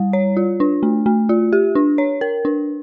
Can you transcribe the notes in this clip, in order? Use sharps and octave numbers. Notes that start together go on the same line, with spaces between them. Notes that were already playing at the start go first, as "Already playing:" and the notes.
Already playing: G3
C#5
F4
D4
A3
A3
F4
G4
D4
C#5
A#4
D4